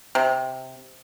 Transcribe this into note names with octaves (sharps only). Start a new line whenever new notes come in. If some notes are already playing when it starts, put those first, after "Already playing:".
C3